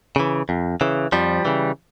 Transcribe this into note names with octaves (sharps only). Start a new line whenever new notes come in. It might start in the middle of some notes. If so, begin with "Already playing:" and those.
C#3 E3
F2
C#3 E3
F2 F3 G3
C#3 E3